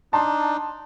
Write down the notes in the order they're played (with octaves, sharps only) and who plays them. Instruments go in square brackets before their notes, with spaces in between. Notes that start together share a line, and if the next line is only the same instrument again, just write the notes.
[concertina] D4 D#4 [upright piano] A5 C6